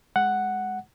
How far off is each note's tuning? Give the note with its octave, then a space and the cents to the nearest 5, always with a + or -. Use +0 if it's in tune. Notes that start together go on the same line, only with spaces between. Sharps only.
G#3 +0 F#5 +0